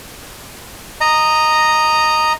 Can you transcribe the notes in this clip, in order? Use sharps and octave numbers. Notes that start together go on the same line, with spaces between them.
D#5 A#5